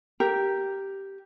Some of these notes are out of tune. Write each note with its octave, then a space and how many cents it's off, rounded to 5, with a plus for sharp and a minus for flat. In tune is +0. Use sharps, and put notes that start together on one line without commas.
G4 -5 A#4 +0